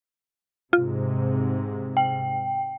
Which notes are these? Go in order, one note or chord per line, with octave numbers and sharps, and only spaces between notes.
G#2 C3 F4
G5